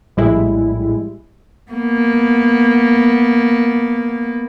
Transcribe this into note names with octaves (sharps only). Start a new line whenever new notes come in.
A#1 A2 G3 G#3 E4
A#3 B3